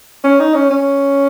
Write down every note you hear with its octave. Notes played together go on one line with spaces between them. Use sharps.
C#4
D#4
C#4
C#4